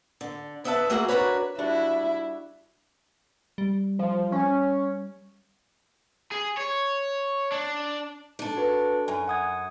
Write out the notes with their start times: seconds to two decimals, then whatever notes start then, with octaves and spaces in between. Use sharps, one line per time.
0.21 D3
0.64 D3 B3 B4 E5 G5 A5
0.90 A3 A#3 F#4 G#4 F#5
1.08 D4 F#4 G#4 A#4 B4 C#5
1.58 G3 D4 E4 F#4
3.58 G3
3.99 F3
4.32 C#4
6.32 G#4
6.58 C#5
7.52 D4
8.39 D4 A4
8.57 F#4 B4
9.08 F#2 G#5
9.28 F#5 D#6 G#6